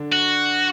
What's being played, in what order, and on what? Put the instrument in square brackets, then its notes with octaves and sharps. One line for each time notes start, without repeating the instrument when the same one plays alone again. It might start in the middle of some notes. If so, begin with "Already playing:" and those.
Already playing: [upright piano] D3 D4
[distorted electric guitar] F#4